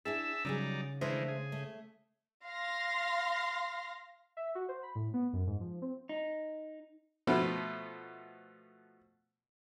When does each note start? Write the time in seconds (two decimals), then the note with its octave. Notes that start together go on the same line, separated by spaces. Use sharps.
0.05 D4 E4 G#4 E5 A5 E6
0.45 C#3 F#3 G3 D#4 G#4 D5
1.01 D#3 E3 G#3 A3 D4 C5
1.28 G#4
1.52 A3
2.45 F5 C6 A#6
4.37 E5
4.55 F#4
4.69 C5
4.83 B5
4.95 A2
5.14 B3
5.33 F#2
5.47 G#2
5.60 F3
5.82 C4
6.09 D#4
7.27 B2 F3 A3 B3